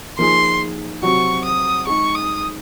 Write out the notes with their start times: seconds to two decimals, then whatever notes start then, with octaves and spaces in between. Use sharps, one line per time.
0.18 F3 A#3 D#4 G#4 C6
1.02 C3 F#3 C4 F#4 C#6
1.44 D#6
1.87 G#3 D#4 G#4 C#6
2.15 D#6